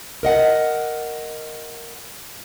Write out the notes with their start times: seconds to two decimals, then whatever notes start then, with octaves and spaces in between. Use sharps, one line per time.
0.23 A#4 D#5 F#5